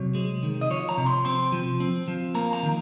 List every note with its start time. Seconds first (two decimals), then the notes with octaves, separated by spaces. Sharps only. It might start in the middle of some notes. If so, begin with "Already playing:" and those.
Already playing: C3 F#3 C#5
0.15 G#3
0.43 D#3
0.61 D#5
0.70 F3 C#5
0.89 A#5
0.97 C3
1.06 C6
1.25 C4 C6
1.52 F3
1.80 C4
2.08 F3
2.35 A#3 A#5
2.53 A#5
2.63 D#3